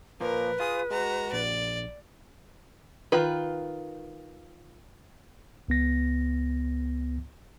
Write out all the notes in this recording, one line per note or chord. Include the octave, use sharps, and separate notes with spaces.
A#2 F3 A#3 A#4 B4
F4 G#4 D#6
G#3 F#4 A#5
A#1 D5
D#3 F4 B4
C#2 B3 A#6